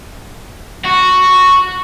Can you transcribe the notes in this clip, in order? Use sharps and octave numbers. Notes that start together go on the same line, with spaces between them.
F#4